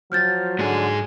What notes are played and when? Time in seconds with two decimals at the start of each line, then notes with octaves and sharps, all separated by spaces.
0.12 F3 F#3 F6 G6 A6
0.59 G#2 D3 G#4